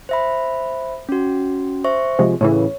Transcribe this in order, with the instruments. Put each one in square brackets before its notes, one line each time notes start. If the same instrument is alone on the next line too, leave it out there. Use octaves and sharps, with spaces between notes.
[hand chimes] C5 E5 B5
C#4 F#4
C5 E5 C#6
[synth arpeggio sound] C3 F3 G#3
[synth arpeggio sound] A2 C#3 E3 [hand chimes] C#5